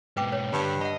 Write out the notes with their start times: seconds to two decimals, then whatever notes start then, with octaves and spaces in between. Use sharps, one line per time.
0.17 G#2 B2 B4 G5 D6
0.32 B4 C#5
0.53 G2 D3
0.81 D#5 F#5 B5